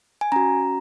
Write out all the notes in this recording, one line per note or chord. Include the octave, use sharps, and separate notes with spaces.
G#5
C#4 F#4 A#5